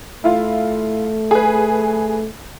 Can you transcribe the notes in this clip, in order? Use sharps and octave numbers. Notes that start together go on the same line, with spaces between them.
A3 E4 F4
G#4 B4